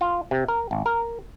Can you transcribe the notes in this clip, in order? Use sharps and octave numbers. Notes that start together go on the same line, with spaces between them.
F4
C3
A#4
G#1
A#4